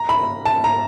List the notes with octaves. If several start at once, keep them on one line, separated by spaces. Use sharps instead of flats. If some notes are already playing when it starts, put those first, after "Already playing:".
Already playing: A#5
B5
A5
A#5